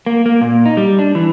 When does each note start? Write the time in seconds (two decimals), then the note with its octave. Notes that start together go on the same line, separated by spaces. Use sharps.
0.06 A#3
0.26 A#3
0.41 A#2
0.66 D#4
0.77 G3
0.99 D4
1.15 E3